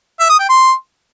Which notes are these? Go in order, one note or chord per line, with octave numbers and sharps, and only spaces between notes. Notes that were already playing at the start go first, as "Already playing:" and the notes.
E5
D#6
G5
C6